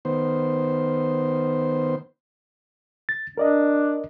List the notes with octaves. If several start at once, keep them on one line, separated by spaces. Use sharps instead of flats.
D#3 B3 C5
A6
D4 A#4 D5 D#5